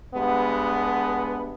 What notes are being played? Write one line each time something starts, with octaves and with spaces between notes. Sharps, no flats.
G2 G#3 B3